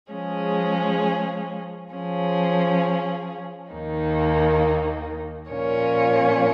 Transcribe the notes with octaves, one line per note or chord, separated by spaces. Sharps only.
F3 G#3 C#4 G#4
F3 C#4 G#4
D#2 D#3 A#3 D#4
A#2 F3 C#4 A#4 C#5